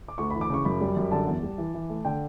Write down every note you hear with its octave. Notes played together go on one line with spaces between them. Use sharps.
D6
D2 C#6
E3 B5
D6
C#3 C#6
F#2 B5
G3
F#2
D3 A5
E2
G3
E3
E3
A3
D3 G5